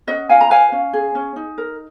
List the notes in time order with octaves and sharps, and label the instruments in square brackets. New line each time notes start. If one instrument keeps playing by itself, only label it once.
[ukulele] C#4 D#5 F#5
F4 F5 G#5
A#5
B4 F5 G#5
C#4
G#4
C#4
D#4
A#4